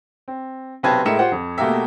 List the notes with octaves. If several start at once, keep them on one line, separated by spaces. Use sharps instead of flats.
C4
B1 C3 C4 B4 A5 G#6
A2 G#3 A#4 E5 C#7 E7
F4 G4 C5 F#5
F2
B2 A3 A#3 G4 A#4 E5